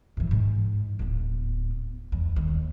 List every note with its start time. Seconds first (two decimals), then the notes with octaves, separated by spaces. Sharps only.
0.17 F#2 E3
0.31 G#2
0.99 D1 B3
2.12 E2
2.36 D#2